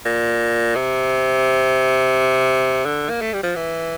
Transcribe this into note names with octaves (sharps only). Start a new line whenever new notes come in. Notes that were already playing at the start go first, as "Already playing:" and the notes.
A#2
C3
D3
A#3
A3
G3
F3
E3